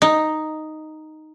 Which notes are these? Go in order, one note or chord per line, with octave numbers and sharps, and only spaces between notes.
D#4